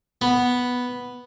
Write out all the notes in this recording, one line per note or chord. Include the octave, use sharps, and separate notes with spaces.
B3